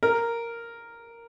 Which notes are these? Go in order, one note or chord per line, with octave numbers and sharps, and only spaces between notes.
A#4